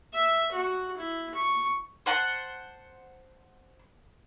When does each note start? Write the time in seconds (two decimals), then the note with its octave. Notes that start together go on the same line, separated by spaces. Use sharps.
0.13 E5
0.52 F#4
0.97 E4
1.34 C#6
2.06 C5 F#5 A5